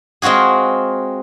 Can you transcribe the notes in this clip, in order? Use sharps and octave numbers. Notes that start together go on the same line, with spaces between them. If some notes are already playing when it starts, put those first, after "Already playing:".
G#3 C4 F4 F#4 G#4